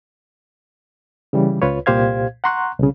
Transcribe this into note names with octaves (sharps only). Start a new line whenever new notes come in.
C#3 E3 G3
C#2 F4 B4 C#5
C2 A#2 G4 C5 F5 G#6
F#5 A#5 C6 C#6 F#6
C2 C#3